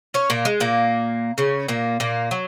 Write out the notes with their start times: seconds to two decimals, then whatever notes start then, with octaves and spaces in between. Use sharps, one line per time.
0.14 C#4 C#5
0.30 A#2 A#3
0.45 G#3
0.60 A#2 A#3
1.38 C#3 C#4
1.68 A#2 A#3
2.00 A#2 A#3
2.31 F#3